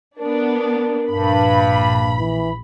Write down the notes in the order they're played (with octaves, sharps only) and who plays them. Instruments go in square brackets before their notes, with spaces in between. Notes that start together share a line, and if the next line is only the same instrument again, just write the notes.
[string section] B3 D4 [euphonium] A#4
[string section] A#1 B5 [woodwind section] G2
[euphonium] E3